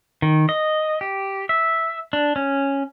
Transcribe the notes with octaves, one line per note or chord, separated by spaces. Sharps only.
D#3
D#5
G4
E5
D4
C#4